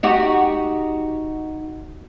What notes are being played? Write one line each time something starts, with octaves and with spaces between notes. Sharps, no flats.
D#4 F#4 G4